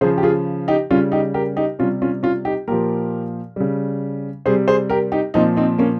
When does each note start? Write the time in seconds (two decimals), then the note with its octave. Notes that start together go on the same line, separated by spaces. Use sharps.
0.01 C#3 F3 G#4 C5
0.18 G4
0.23 F4 G#4
0.68 D#4 G4
0.90 C#3 G3 C#4 F4
1.12 D#4 G4
1.34 G4 A#4
1.57 D#4 G4
1.79 C3 G3 C#4 F4
2.02 C#4 F4
2.23 C#4 F4
2.45 D#4 G4
2.68 A#2 F3 G4 A#4
3.56 C#3 G3
4.46 C3 G3 G#4 C5
4.68 G#4 C5
4.89 G4 A#4
5.12 D#4 G4
5.34 A#2 F3 C4 D#4
5.56 C4 D#4
5.78 A#3 C#4